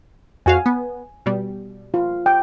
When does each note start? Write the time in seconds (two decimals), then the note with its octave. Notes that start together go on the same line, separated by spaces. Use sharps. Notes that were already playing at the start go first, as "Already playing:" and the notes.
0.46 F2 F#4 F5 G#5
0.66 B3
1.26 B2 G3
1.94 F4
2.26 G5